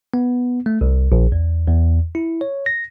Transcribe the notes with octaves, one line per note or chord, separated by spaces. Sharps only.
B3
A3
C2
A#1
E2
E2
E4
C#5
A#6